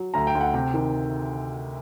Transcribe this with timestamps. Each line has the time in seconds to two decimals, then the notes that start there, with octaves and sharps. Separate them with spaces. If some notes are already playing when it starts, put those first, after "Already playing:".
Already playing: F#3
0.14 D2 A#5
0.27 G5
0.35 D2
0.41 F#5
0.54 C3 G5
0.74 D#3